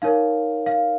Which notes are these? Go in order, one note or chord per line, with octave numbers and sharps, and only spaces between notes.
D#4 A#4 C#5 F5
F5